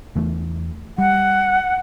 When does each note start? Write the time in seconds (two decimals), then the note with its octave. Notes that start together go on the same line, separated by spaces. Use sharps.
0.15 E2 E3 A3
0.98 G3 F#5